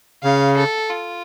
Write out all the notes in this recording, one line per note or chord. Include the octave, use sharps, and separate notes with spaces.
C#3 F5
A4
F4